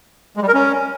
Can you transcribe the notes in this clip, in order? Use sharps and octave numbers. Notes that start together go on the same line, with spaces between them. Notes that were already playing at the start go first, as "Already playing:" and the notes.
G#3
G3
A#4
C#4